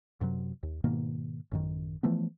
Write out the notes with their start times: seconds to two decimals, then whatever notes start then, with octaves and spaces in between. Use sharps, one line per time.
0.21 F#2 C3 F#3
0.63 D#2
0.84 G#2 B2 D#3 A#3
1.52 A1 F#2 D#3
2.03 E3 F3 A3 B3